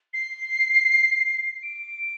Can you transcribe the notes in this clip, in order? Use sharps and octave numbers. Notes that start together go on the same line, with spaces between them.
C7
D7